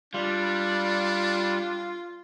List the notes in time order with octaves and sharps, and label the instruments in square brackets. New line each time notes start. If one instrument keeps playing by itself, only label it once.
[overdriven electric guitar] G3 [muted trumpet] D4 [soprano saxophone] F4